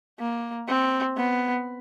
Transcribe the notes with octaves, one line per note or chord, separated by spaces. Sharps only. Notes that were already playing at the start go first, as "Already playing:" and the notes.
A#3
C4
B3